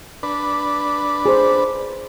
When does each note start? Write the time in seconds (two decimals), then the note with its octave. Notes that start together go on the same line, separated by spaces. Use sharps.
0.23 D4 B4
1.26 G#4 C5